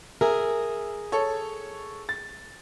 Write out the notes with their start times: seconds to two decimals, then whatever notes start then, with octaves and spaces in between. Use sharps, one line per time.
0.21 G#4 A#4 E5
1.12 A4 C#5
2.09 A6